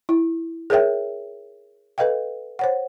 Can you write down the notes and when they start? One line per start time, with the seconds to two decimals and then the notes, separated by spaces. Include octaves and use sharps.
0.09 E4
0.70 G#4 A#4 C#5 E5 G5
1.98 A4 B4 D#5 F5 G5
2.59 C5 C#5 F#5